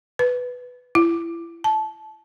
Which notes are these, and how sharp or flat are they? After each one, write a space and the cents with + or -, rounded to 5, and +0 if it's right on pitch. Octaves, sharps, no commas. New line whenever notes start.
B4 +5
E4 +30
A5 -20